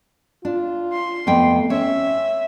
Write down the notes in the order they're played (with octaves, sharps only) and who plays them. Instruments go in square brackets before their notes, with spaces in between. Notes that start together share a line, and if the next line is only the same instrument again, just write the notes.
[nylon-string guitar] D4 [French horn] F4
[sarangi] C6
[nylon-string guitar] F2 B3 G5 [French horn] A3
[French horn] C#4 [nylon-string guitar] C#5 [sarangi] E5